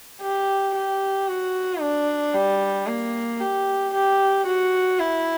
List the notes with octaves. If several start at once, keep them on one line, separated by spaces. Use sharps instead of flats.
G4
G4
F#4
D4
G3
A#3
G4
G4
F#4
E4